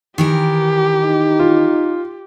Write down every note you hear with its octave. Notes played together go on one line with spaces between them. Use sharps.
D#3 E3 G4 A#4
D#4
F4